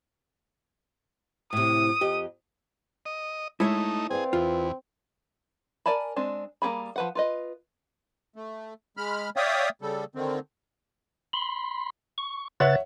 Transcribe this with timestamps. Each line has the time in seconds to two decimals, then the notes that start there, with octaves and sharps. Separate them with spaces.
1.53 A2 C3 D#6
2.01 F2 G4 D#5
3.06 D#5
3.60 G#3 A3 D#4 E4 C#5 E5
4.10 C4 G#4 B4 D5 F5
4.33 E2 F4
5.86 A#4 D5 G#5 A5 B5
6.16 G#3 C4 D4
6.62 G3 A#3 C#4 G#4 B5
6.96 F3 B4 F#5
7.15 F4 B4 D#5
8.36 A3
8.97 G#3 B5 F6
9.36 C#5 D5 E5 F5 G5 D#6
9.82 C#3 G3 A4
10.15 D3 D#3 C4
11.33 B5 C6
12.18 C#6
12.60 C#3 B4 C#5 E5 F#5 A6